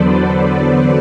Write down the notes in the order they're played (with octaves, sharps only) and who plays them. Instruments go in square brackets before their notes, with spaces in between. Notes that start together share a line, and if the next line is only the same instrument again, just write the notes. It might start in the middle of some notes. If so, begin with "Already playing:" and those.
Already playing: [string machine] E2 D3 F#3 B3 A4 B4 C5 D5